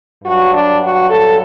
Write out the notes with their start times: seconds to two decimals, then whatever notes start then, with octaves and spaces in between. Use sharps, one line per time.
0.22 G2 F#3 F#4
0.51 D4
0.79 F#4
1.08 A4